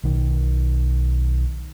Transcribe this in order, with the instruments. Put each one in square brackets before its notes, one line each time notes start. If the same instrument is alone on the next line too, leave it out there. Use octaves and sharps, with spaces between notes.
[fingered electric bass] B1 D#3